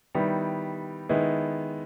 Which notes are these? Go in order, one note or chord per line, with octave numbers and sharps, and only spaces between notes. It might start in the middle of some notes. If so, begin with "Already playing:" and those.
D#3 G3 B3 E4
D#3 G#3 B3 E4